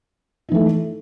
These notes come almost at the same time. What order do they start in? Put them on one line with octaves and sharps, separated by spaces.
D#4 E3 A3